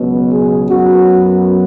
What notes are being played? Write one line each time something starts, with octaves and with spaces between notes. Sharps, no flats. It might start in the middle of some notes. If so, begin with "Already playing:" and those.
Already playing: C#2 B2 F#3 B3
G#4
F#2 F#3 B3 F#4